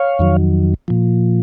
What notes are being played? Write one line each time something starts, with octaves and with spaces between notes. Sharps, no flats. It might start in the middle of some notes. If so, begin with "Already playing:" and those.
Already playing: C#5 F5
F2 D#3 F#3
A#2 F3